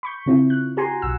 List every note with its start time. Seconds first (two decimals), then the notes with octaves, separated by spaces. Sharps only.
0.03 B5 C#6 G6
0.26 C#3 C4 E4 F4
0.50 F#6
0.77 F#4 G4 G#5 A#5 C6
1.02 B1 F#5 E6